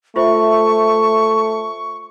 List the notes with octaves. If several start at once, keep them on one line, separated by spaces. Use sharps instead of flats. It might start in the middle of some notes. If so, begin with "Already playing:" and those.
A3 F4 C5 E5 C#6